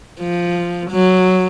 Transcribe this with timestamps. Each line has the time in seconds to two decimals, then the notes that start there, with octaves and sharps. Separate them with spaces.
0.20 F3
0.91 F#3